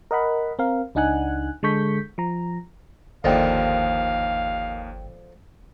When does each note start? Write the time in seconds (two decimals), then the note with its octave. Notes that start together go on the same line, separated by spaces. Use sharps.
0.11 A#4 D#5 F#5 B5
0.59 C4 A#4 F5
0.95 C#2 D4 D#4 F#5 G#5 F#6
1.63 D3 G#3 A4 C#6 G6 B6
2.18 F3 A#5
3.24 G1 D#2 D3 F3 A#3 D#5 F5 G5